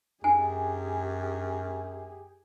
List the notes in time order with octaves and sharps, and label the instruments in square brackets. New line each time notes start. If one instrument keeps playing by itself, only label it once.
[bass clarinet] F#2 [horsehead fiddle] G4 G#4 [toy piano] G#5